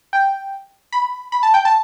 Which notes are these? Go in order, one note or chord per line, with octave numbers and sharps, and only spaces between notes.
G5
B5
B5
A5
G5
A5